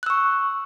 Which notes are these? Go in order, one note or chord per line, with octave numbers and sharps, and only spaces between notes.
C#6 E6 F#6